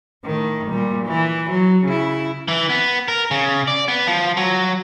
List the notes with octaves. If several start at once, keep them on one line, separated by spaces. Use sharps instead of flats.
A2 D#3
A#2 G3
E3
F#3
C#3 E4
E3
B3
A#4
C#3
D5
B3
F3
F#3